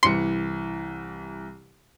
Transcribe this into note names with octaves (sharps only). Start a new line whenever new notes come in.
C2 E3 C6 C#7